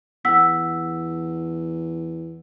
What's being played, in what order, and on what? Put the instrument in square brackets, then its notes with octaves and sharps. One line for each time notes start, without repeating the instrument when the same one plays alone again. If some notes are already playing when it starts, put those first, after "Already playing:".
[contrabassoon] E2 [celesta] F#5 E6 B6